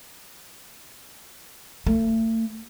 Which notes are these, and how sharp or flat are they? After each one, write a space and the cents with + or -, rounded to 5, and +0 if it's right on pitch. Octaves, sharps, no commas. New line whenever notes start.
A3 +35